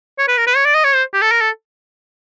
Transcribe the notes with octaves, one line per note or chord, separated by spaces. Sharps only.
C#5
B4
A#4
B4
C#5
D5
D#5
C#5
C5
G4
A4
A#4
A4